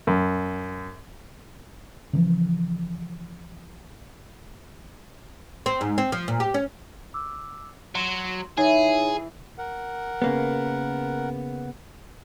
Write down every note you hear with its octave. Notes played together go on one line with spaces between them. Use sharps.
F#2
C#3 E3 F3
C4
G#2
C4
F3
A#2
G4
C#4
D6 E6
F#3 C6
E3 D#4 G#4 C#5
A#4 F#5
C#3 A#3 B3